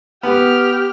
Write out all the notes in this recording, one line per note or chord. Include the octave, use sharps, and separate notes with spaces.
B3 G4 F6